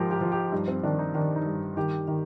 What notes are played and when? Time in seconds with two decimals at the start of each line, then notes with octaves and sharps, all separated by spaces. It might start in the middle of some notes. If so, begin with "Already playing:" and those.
Already playing: G#2 F3 G4 A#4
0.11 G4
0.21 F3
0.32 G4
0.52 G2 D#4
0.68 C4
0.83 D#3 D4
0.99 D#4
1.14 D#3 D4
1.36 D#4
1.46 G2
1.77 D#3 G4
2.08 D#3